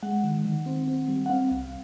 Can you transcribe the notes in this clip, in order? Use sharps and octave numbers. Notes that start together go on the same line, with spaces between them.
G#3 F#5
D#3
D#3
C4
C4
G3
F#5
C4 F5
C2